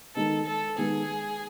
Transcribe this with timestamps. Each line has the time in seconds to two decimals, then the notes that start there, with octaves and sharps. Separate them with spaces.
0.15 D#3 G#3 B3 D#4 A4
0.46 A4
0.78 D#3 G#3 B3 D#4 G#4